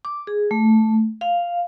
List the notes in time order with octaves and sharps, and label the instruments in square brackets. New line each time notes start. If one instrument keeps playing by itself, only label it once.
[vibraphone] D6
G#4
A3
F5